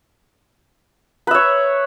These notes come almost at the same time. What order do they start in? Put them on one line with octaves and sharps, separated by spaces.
B4 E5 C#5